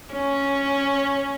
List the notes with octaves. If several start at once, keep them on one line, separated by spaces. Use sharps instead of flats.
C#4